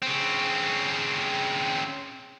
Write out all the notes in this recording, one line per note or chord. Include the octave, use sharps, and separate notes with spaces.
C#3 C4